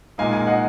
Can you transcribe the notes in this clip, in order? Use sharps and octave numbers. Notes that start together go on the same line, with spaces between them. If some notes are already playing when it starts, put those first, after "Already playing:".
A#2 G#3 D#4 F5 G#5
F5 G#5
D#5 F#5